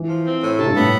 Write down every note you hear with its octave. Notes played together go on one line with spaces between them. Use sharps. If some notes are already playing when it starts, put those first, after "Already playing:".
Already playing: E3
F3
C4
A2
C3 A4
G2
A2 B3